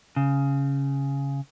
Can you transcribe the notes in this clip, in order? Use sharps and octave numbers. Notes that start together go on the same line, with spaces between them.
C#3